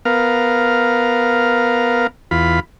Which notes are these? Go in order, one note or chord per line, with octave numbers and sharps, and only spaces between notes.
B3 A#4 F5
E2 F4 B5